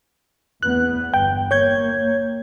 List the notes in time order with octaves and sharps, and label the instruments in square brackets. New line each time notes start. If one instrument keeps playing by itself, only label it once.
[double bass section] E2 B3 [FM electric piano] F#6
[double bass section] G1 [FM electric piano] G5
[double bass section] A#3 [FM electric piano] C#5 G6 G#6